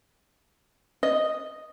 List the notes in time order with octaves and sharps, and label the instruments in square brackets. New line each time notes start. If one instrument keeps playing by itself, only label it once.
[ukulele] D#5